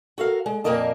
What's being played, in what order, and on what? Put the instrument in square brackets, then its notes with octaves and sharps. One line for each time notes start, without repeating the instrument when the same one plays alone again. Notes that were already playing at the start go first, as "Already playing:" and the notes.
[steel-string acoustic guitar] F#4 A4 A#4 F5
G#3
F2 A#2 A#3 A#4 D#5 A5